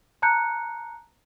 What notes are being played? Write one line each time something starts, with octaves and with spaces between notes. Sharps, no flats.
A5 A#5 F#6 G6 C#7